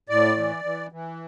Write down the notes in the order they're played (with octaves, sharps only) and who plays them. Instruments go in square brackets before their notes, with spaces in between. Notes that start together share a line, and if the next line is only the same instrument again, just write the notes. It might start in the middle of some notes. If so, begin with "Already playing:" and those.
[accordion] A2 D5
E3
E3
E3